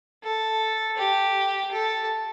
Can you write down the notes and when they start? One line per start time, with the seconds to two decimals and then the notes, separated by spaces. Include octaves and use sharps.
0.23 A4
0.97 G4
1.72 A4